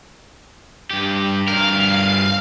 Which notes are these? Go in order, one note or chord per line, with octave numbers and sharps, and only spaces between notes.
G2 G4
G2 A#4 F5